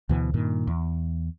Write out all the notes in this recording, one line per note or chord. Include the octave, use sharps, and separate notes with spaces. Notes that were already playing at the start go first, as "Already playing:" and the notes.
D2 B2 E3
G2 A#2 D#3
E2